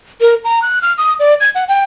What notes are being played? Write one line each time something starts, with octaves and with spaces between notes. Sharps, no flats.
A#4
A#5
F#6
F6
D#6
D5
G#6
F#5
G5